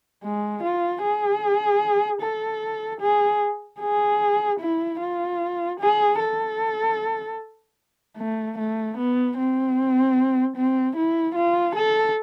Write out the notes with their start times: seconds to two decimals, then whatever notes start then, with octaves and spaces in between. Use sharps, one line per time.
0.24 G#3
0.63 F4
1.02 G#4
2.21 A4
3.01 G#4
3.80 G#4
4.60 E4
5.00 F4
5.80 G#4
6.20 A4
8.17 A3
8.58 A3
8.98 B3
9.38 C4
10.56 C4
10.96 E4
11.35 F4
11.76 A4